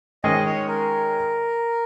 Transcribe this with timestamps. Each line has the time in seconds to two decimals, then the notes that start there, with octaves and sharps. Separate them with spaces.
0.24 D#3 G#3 C#4 G#4 D#5
0.46 C#5
0.68 A#4